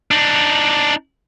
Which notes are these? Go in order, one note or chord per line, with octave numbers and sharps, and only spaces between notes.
D4 D#4